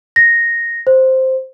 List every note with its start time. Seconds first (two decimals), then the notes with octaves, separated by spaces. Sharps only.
0.16 A#6
0.87 C5